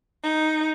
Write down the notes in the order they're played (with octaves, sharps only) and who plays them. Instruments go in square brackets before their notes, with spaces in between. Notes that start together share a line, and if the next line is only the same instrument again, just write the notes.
[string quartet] D#4